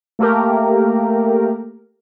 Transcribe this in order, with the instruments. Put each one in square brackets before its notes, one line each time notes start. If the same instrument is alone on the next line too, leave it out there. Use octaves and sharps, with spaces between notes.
[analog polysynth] A3 A#3 G4 A#4